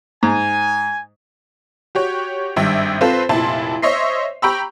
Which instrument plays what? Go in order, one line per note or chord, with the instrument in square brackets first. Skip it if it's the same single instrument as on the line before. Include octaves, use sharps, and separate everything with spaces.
[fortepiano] G#2 [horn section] G#5
[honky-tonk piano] F#4 G4 C#5
G#1 G2 E5 G5
C4 F4 A4 B4 C5
F1 A#2 E4 A5 C6
C5 C#5 D#5 E5 C6 C7
G4 G5 A#5 B5 C#6 E6